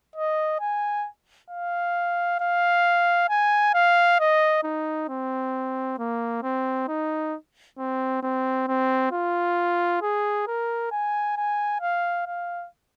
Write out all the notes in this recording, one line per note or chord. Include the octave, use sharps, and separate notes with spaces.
D#5
G#5
F5
F5
G#5
F5
D#5
D#4
C4
A#3
C4
D#4
C4
C4
C4
F4
G#4
A#4
G#5
G#5
F5
F5